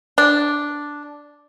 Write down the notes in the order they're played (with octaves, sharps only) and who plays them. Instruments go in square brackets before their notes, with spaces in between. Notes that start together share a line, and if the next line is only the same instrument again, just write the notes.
[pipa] D4